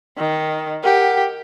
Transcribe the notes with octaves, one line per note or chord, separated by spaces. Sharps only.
D#3
G4 A#4 F#5 G5